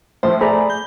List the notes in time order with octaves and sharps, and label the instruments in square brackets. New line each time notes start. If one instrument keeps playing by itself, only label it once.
[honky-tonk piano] A2 F3 [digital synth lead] C5
[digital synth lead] A3 [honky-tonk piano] G#4 [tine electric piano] D5 A#5 B5
[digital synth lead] G6